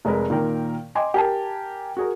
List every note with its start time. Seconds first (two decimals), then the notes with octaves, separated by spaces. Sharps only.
0.05 F1 G#3 A#4 B4
0.30 A#2 D#3 A#4 G5
0.95 D#5 G5 G#5 C6 D6
1.14 G4 A#4 G#5 A5
1.97 F#4 G#4 A#4